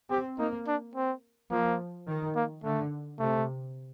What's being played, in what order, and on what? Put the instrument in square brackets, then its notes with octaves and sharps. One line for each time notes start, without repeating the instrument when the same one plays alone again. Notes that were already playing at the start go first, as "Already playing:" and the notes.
[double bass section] C4 [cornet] G4
[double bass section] A#3 [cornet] D#4
[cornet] D4
C4
[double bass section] F3 [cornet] A#3
[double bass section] D#3
[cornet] A#3
[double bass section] D3 [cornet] A3
[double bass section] C3 [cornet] A3